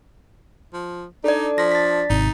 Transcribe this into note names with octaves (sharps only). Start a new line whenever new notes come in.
F3
D4 D#4 A4 D5
F3 A#6 B6
A6 B6
G#1 C3 D#4